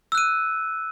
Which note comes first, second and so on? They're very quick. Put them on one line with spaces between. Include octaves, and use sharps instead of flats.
E6 F#6 D#7